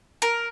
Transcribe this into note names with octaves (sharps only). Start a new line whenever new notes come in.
A#4